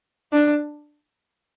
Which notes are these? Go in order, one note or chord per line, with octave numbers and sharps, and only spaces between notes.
D4